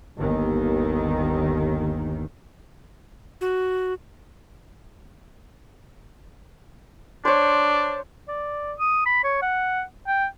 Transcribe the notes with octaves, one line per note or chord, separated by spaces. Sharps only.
G1 D#2 D#3
F#4
D4 C5 C#5
D5
D#6
B5
C#5
F#5
G5